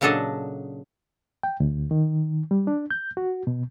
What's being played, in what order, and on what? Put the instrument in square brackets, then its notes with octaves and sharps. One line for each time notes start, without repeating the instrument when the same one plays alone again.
[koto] A#2 C#3 F#3 D4 A4 D#5
[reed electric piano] G5
D2
D#3
G3
D4
G6
F#4
B2